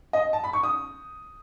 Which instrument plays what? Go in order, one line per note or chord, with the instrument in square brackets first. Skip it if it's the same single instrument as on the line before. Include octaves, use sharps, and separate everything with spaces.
[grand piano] D#5
A5
B5
C#6
D#6